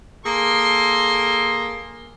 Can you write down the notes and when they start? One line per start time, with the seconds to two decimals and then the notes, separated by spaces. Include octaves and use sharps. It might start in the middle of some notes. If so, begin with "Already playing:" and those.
0.24 A#3 G#4 A4 C6